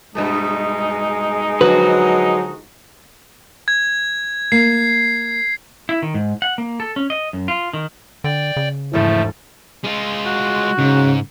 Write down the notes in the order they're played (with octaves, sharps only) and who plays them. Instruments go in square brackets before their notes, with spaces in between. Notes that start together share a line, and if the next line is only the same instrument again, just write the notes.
[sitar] G2 B2 A3 [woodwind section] G#3 D#4
[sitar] D3 F3 F#4 [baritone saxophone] F#3 [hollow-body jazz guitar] B4
[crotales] G#6
[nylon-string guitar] A#3 [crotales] C7
[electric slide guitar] E4
D#3
G#2
F#5
A#3
A4
C#4
D#5
F#2
F4
D#3
[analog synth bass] D3 [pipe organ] D5 G5
[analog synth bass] C#3
[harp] E1 G#2 A4 [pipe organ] F3 A3 [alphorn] E4
[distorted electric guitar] G#3 F4
[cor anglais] F#4
[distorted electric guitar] G#2 [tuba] C#3